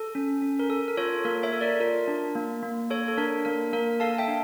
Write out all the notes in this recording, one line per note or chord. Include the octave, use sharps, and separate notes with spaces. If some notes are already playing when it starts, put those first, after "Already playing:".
Already playing: A4
C#4
C#4
A#4
A4
A#4
F4 A4 C#5
A#3 A#4
C#5 E5
A4
A#4 D5
F4 A#4
D4
A#3
A#3
A4 C#5
A4
D4 A#4
A#3 A#4
A#3 A#4
A4 F5 A5
E5 G5
D4